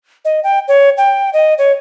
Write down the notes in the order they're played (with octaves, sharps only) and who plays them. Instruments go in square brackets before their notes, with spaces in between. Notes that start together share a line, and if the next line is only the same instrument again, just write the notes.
[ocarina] D#5
G5
C#5
G5
D#5
C#5